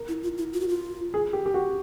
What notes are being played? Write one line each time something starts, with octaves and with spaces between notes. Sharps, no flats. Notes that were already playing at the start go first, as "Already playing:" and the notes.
Already playing: A#4
E4
F4
E4
F4
F#4
F4
G#4
G4
G4
F#4